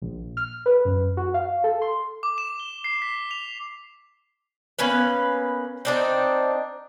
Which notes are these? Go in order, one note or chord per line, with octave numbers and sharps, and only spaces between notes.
A#1
F6
B4
F#2
F#4
F5
A4
C6
D6
E7
G7
C7
B6
F7
A#3 B3 C#4 B4
C4 D4 D#4